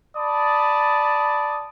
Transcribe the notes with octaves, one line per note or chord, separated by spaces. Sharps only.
D5 A5 B5 D#6